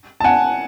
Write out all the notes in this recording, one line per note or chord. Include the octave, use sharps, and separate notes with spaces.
A5
F#5 G#5